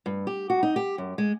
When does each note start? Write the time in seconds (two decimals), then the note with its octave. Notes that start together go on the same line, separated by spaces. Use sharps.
0.06 G2
0.27 G4
0.50 F#4
0.63 D#4
0.76 G4
0.98 F#2
1.18 G#3